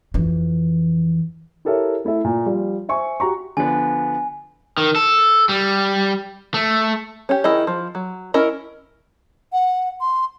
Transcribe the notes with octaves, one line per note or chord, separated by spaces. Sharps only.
F2 E3
E4 G4 A4 A#4 C#5 E5
A3 E4 A4 E5
A#2
F3 G3
C5 E5 G#5 C#6
F#4 G4 A#5 C#6
D3 F3 B3 G#5
D#3
A4
G3
A3
C#4 G4
D#3 E4 G#4 D#5
F3
F#3
C#4 E4 A#4 D#5
F#5
C6